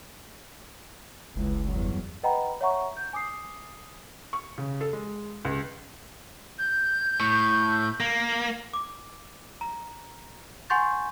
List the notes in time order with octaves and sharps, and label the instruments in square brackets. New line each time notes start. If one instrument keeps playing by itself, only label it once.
[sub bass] F#1 [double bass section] C#2 E3
[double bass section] E2 G2 F#3
[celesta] B4 D#5 F#5 G5 A#5 B5
C#5 E5 F#5 A#5 C#6
G6
G#5 D6 D#6 C7
[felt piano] C#6
C#3
A4
G#3
C#2
[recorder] G6
[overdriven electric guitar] A2
[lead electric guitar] A#3
[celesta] D6
A#5
F#5 G#5 C6 C#6 G6 A6